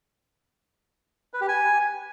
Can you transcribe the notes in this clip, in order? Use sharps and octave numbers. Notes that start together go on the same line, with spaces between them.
B4
G4
G#5